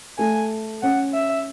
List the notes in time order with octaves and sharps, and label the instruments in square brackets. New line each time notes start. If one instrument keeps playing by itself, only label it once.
[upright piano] A3 [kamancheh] G#5
[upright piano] C#4 [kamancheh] F#5
[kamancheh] E5